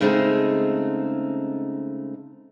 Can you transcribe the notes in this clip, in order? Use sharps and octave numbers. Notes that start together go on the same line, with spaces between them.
C#3 G#3 A3 C4 C#4 D#4